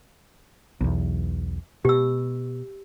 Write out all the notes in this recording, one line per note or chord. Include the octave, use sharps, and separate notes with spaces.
B1 E2
B2 G4 E6